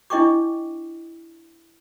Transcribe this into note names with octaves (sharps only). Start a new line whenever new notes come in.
D4 E4 D#5 G5 C#6 D6